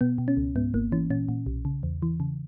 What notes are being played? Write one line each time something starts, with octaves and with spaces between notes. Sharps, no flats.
B2 B3
B2
C#4
C#2
G#2 B3
G#1 A#3
E3 C#4
A#2 C#4
A#2
B1
C#3
E2
E3
C#3